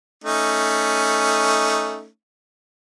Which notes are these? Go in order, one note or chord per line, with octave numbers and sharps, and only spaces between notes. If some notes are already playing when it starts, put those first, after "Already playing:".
A3 C#4 D#4